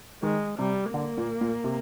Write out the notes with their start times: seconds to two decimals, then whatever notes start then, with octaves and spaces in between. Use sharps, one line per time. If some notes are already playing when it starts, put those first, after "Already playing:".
0.23 D#3 G#3
0.59 C3 G3
0.93 D3 A#3
1.18 A#2
1.41 A#2
1.64 C3